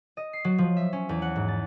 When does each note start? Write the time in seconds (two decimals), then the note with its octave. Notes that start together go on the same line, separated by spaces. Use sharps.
0.17 D#5
0.33 C7
0.45 F#3
0.58 F3
0.77 E5
0.93 C#4
1.09 E2
1.22 F#5
1.36 G#2
1.48 A6